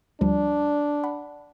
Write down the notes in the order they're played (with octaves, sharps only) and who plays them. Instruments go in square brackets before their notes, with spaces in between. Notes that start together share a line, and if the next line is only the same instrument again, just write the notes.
[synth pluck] D2 F3 G3 [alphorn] D4
[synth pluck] F#5 B5